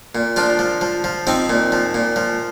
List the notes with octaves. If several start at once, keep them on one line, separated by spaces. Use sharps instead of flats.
A#2
F3 D4 F4
F3
F3
F3
F3 C4 D#4
A#2
F3
A#2
F3